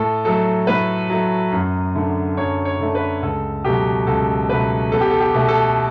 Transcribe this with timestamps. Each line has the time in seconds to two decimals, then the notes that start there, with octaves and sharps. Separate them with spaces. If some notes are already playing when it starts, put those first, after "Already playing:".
Already playing: A2 A4
0.25 F#3 A3 A4
0.67 A2 B4
1.10 F#3 A3
1.52 F#2
1.95 D3 A3
2.37 F#2 C#5
2.65 C#5
2.79 D3 A3
2.95 B4
3.22 C#2 A4
3.64 B2 F#3 A3 G4
4.07 C#2 A4
4.49 B2 F#3 A3 B4
4.92 E2 A4
5.01 G4
5.11 A4
5.20 G4
5.34 B2 A3
5.48 A4